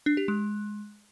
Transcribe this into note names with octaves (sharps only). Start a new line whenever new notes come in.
D4
G4
G#3